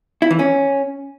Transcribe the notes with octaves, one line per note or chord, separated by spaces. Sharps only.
E4
E3
C#4